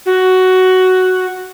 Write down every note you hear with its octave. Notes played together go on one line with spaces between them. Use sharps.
F#4